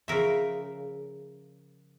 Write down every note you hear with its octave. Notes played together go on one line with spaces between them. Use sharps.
C#3 F3 A#4 E5